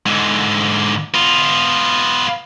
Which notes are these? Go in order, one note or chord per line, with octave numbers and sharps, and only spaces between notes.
G#2 D3
B3 F4